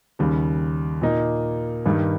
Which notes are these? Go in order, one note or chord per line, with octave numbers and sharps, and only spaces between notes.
D#2 C#3 G3
A#2 A#3 D#4
G2 D#3 G3